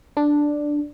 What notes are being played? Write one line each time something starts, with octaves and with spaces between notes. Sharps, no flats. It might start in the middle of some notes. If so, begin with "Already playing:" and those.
D4